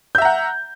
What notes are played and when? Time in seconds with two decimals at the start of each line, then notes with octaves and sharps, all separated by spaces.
0.15 G6
0.18 E5
0.22 A#5
0.25 F#5